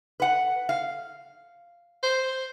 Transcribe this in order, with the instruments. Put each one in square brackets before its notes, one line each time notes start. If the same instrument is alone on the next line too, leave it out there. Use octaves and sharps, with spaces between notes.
[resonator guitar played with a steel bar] B4 F#5
F5
[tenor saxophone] C5